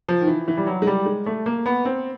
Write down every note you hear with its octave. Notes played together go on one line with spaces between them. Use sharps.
F3
D#3
E3
E3
G3
F#3
G#3
G3
G#3
A3
A#3
B3
C4